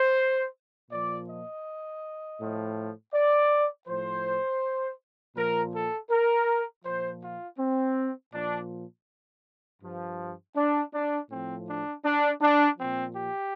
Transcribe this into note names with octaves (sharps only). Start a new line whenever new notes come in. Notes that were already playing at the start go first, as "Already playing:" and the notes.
Already playing: C5
A#2 F3 D5
D#5
A2 F3
D5
A2 F3 C5
A#2 F3 A#4
A4
A#4
A#2 F3 C5
F4
C4
A#2 F3 D4
G2 F3
D4
D4
A2 F3 C4
D4
D4
D4
A#2 F3 C4
G4